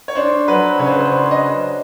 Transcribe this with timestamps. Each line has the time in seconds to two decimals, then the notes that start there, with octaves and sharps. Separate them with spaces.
0.08 C#5
0.15 D4 C5
0.48 F#3 B4
0.79 C#3 C#5
0.87 C5
0.94 B4
1.01 C5
1.11 D4
1.31 D#5